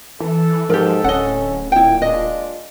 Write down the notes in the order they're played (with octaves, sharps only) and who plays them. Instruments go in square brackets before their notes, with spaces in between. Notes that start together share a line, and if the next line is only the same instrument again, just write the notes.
[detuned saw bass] E3 [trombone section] A4
[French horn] G#2 [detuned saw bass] F3 [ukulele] G4 A#4
[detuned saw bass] D1 [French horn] C#4 [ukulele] D#5 F#5
[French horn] A#2 [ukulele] E4 G5
[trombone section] G#3 D4 F4 [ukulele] D#5